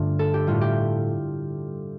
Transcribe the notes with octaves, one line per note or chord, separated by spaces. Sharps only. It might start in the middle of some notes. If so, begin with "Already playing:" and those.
Already playing: G2 D3 A3 D4 F4
A4
G4
A2 G3 F4
G4